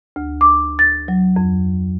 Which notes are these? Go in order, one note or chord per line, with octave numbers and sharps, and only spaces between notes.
D2
D6
A6
F#3
F2